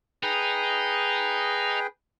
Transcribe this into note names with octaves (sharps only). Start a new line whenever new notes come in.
D#4 G#4 B4 G5